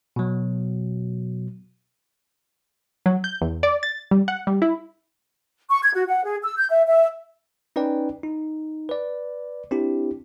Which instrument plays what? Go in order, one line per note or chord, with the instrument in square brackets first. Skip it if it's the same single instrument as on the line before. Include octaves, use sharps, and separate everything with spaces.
[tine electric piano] B2 F#3
[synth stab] F#3
G6
E2
D5
A6
G3
F#5
G3
E4
[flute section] C#6
G#6
F#4
F#5
G#4
E6
G6
E5
E5
[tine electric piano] C#4 D#4 B4 D5 G5
D#4
B4 D5
C4 D4 E4 G4